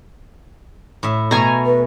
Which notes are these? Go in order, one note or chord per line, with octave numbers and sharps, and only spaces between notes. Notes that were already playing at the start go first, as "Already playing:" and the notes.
A2 E5
B2 A3 G#5 A#5
B4